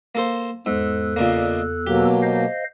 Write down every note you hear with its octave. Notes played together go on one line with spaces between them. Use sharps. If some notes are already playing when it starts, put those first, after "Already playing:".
A#3 A4 C5
E2 G#2 A4 F#6
A#2 C#3 A#3 D5 D#5
B2 F#3 A#3 G4
C5 D#5 F5